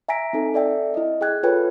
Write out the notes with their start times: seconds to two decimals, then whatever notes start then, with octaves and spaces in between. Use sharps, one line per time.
0.08 E5 G#5 A#5 A#6 B6 D7
0.33 C4 D#4 A4
0.54 A4 D5 E5 G5
0.94 E4 D#5
1.21 G#4 G5 F#6 G#6
1.43 F4 A4 B4 C#5 G5